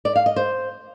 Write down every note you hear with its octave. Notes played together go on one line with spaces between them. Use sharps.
D5
F5
D#5
C5